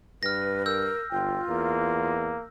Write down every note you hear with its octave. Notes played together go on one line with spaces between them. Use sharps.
G2 B4 F6 A#6
A#4 E6 G6
G1 F4 G5
E2 A#3